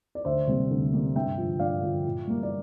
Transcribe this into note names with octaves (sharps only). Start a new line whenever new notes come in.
D5
D2 C5 E5
C3 G3 A#3
D2
C3 G3 A#3
G2 E5 G5
D3 F3
G2 D5 F5
D3 F3
A#2
G3 A#3
D5